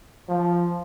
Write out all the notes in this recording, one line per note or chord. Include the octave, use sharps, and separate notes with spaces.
F3